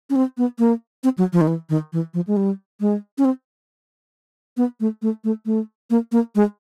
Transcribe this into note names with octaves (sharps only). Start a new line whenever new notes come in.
C#4
C4
B3
A#3
C4
F#3
F3
D#3
E3
D#3
E3
F3
G#3
G3
G#3
C#4
C4
B3
A3
A3
A3
A3
A#3
A#3
G#3